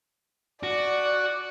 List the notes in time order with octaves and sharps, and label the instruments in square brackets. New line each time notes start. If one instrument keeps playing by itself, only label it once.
[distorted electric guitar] F#4 [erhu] D5